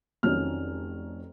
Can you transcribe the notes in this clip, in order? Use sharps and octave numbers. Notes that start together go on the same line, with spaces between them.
F1 F2 D#3 F#3 C#4 F6